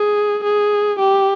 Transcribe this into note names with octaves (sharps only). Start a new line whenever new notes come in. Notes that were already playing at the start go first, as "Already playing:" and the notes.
Already playing: G#4
G#4
G4